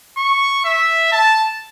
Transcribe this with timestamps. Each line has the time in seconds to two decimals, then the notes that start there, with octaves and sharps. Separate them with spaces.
0.17 C#6
0.65 E5
1.12 A5